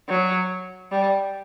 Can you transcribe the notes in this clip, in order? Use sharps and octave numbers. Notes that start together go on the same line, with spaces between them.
F#3
G3